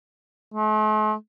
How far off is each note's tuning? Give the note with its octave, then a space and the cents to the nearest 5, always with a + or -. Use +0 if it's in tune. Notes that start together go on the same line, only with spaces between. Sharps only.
A3 -45